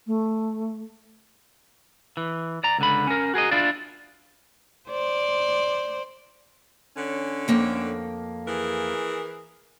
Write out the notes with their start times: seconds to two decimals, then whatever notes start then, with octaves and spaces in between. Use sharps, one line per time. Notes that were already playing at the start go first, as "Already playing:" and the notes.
0.06 A3
2.17 E3
2.64 D5 A#5
2.79 C#2 D3 B5
3.07 C#4 A#4
3.34 F#4 G#4 A#4 D#5
3.51 D4 E4 F4 D5
4.90 C5 D5
6.95 D3 C#4
7.48 F2 A#3 G5
8.47 E3 G#4 A#4